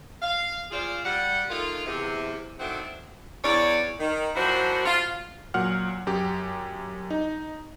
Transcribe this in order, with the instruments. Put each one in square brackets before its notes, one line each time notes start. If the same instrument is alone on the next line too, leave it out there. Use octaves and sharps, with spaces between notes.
[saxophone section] F5
A#2 F4 G#4 C5 D5 F5
G3 F#5
D#3 A3 A#3 F4
E2 C3
D#3 A3 C4 D4 E4 F#4
E2 C#5 D5
D#3
F#2 F3 D4 E4 F#4 C5
F4
[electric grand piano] A#2 F#3 F#5 F6
F#2 G4
D#4